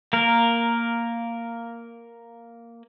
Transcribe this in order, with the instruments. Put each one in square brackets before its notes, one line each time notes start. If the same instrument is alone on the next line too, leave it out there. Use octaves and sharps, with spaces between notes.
[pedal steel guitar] A#3 A#4